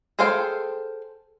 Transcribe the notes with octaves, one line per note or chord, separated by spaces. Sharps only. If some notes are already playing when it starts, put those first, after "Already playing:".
G#4 A4 C5 F5 G5